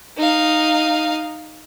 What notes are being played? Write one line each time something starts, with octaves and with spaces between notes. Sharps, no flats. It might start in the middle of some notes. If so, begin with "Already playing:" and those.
D#4 F5